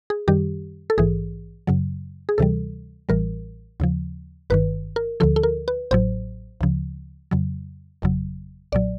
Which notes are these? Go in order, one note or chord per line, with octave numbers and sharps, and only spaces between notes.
G#4
F#2 D#3 G3 G4
A4
A#1 G#2 E3 G#4
F#2 C#3 F#3
G#4
D2 C3 E3 G3 A4
A1 A2 E3 G3 A#4
D#2 C#3 F3
G1 G2 D#3 B4
A#4
D2 D3 F3 A4
A4
A#4
B4
A1 A2 F#3 C5
D2 C#3 F3
F2 C#3 F#3
G1 F2 C#3 F#3
B1 A#2 F#3 D5